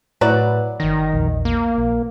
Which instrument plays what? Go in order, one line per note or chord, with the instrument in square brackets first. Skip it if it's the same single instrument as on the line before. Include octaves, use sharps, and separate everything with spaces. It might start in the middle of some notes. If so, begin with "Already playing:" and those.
[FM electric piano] A2 E4 B4 [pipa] F#3 F#4 D5
[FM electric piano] G1 A#6 [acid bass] D#3
[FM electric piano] A#1 E2
[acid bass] A#3
[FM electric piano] A#1